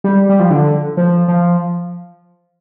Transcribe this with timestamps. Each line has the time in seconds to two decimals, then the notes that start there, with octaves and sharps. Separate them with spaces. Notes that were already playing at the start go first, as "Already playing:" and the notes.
0.04 G3
0.29 G3
0.40 F3
0.50 D3
0.97 F3
1.28 F3